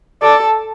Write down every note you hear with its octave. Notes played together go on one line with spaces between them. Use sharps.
A4 D5